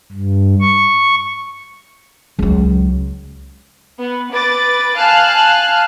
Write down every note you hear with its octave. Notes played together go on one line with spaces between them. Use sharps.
G2
C#6
C#2 F#3
B3
B4 D6 A6
F5 G#5 A5 F6 F#6